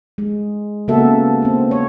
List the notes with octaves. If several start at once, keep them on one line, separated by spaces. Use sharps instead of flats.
G#3
C#3 A#3 B3 F#4 A4 E5
A#3 C4
C#5